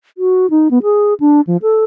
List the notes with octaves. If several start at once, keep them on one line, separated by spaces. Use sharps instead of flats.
F#4
D#4
B3
G#4
D4
F3
A4